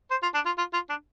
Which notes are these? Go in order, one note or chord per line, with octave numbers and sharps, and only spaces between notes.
C5
F4
D4
F4
F4
F4
D4